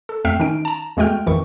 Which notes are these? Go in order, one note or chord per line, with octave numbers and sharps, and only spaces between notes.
A4
F2 A3 E5 G5 F6 C7
D#3 C#4 D#4 D7
A5 A#5
E2 G#3 A3 F#4 G5 F6
G#1 F2 D#3 E3 C#6